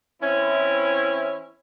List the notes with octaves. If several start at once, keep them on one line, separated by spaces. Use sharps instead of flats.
E3 C4 C#4 E4